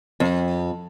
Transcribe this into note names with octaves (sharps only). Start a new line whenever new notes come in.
F2